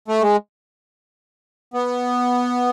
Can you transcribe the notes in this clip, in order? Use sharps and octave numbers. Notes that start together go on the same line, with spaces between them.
A3
G#3
B3